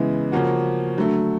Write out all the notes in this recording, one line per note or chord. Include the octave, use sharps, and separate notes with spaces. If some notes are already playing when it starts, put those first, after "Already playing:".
Already playing: C#3 E3 G#3 B3 E4
C#3 F3 A#3 C#4 F#4
D3 F#3 A3